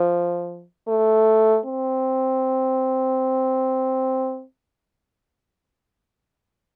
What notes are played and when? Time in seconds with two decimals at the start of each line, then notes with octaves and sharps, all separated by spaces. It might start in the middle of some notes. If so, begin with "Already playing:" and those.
Already playing: F3
0.88 A3
1.65 C4